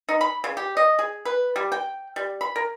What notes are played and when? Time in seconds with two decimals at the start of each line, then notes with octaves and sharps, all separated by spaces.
0.09 D#4
0.21 B5
0.44 C#3
0.57 G4
0.77 D#5
0.99 G#4
1.25 B4
1.56 G3
1.72 G5
2.16 G3
2.41 B5
2.56 A#4